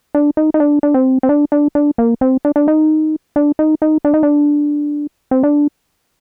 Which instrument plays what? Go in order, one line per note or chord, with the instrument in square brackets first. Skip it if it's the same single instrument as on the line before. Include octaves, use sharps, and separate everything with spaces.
[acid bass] D4
D#4
D#4
D4
D4
C4
C4
D4
D4
D4
A#3
C4
D4
D4
D#4
D4
D#4
D#4
D4
D#4
D4
C4
D4